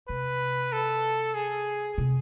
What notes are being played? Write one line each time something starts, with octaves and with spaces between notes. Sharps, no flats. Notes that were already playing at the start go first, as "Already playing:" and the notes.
C3 B4
A4
G#4
C3